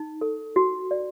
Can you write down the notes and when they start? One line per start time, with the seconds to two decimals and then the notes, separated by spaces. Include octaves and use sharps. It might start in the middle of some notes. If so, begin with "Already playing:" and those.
Already playing: D#4
0.21 A4
0.56 F#4
0.91 D5